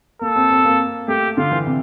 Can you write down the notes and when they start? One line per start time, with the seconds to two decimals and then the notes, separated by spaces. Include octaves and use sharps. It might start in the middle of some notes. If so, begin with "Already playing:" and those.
0.21 A#3 A4
0.36 C4
0.50 C4
0.65 A#3
1.08 A3 G4
1.37 D3 F4
1.51 E3
1.66 C3